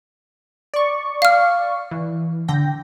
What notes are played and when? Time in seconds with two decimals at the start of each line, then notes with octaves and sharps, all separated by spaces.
0.74 D5 C#6
1.22 F5 F6
1.91 E3
2.48 D3 G5 A#6